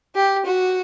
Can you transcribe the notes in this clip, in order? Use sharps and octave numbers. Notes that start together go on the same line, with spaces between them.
G4
F#4